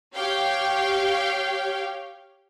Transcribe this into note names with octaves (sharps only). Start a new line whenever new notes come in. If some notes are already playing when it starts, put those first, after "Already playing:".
G4 C#5 F5 G5